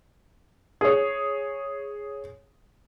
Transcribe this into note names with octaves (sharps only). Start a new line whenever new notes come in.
G#4 C#5